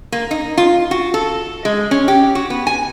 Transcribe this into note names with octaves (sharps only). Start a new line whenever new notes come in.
A#3
D#4
F4
F#4
A4
G#3
C#4
G4
F#4
B3
G#5